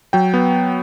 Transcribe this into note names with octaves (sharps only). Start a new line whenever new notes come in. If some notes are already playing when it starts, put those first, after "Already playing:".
F#3 G5
B3